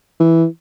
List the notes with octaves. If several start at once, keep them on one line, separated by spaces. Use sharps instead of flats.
E3